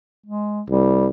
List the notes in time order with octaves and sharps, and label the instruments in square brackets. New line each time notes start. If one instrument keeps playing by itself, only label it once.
[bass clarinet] G#3
[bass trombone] C2 [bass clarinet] G3